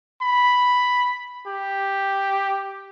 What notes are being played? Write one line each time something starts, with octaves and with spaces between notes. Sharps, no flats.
B5
G4